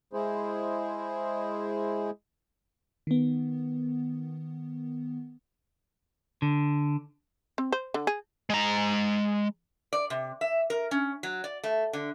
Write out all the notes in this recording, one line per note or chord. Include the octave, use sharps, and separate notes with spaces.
G#3 E4 G#4 C5
D#3 B3
D3
C4
C5
D3
G#4
G#3 A#5
D5
C3
E5
A#4
C#4
F#3
D5
A3
D3